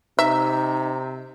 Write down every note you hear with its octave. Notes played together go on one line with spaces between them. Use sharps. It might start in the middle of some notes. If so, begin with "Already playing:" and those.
C3 D#4 E5 A#5